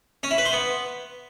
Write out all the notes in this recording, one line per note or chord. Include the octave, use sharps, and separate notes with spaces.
C#4
E4
B4
C5
B3